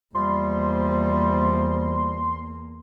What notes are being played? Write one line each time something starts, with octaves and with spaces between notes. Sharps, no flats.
E2 C3 F3 G3 A#3 C6